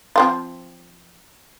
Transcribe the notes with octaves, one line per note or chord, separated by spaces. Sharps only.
F3 C4 F4